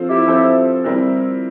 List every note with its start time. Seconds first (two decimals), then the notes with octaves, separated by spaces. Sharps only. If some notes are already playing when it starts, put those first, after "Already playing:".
Already playing: F3 C4 F4 A4 C5
0.09 E4 G4
0.27 F3 C4 F4 A4 C5
0.84 G3 C4 E4 A#4